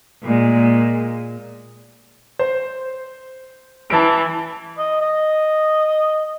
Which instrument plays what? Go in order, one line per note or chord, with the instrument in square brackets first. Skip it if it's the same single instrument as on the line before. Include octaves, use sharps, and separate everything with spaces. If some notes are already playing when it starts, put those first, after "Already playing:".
[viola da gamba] A#2 G#3
[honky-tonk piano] C5
[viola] E3 [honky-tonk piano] A5 D7
[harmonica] D#5
D#5